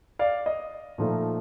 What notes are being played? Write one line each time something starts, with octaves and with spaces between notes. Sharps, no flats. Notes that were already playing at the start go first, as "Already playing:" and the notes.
D5 F5
D#5
A#2 F3 A3 D#4